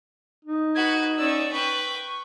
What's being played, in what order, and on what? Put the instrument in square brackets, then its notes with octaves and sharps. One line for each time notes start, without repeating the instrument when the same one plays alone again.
[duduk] D#4
[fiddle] F#4 B4 [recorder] G#6
[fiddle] C#4 E6 [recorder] D5
[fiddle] B4 G5 [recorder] C#6